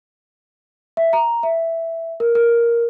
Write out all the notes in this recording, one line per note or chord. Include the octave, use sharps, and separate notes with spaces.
E5
A#5
E5
A#4
A#4